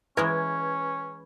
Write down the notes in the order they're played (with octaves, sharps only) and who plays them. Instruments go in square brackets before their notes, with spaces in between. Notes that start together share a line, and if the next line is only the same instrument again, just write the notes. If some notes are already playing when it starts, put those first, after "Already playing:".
[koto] E3 G#3 A#4 [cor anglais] C#4 [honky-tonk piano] B4 G#6